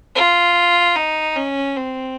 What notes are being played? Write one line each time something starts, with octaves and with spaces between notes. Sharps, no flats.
F4
D#4
C#4
C4